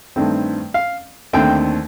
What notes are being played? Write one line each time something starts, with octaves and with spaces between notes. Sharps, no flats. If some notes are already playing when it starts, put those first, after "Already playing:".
G2 D#3 A3 C4
F5
D#2 D3 A3 C4 G5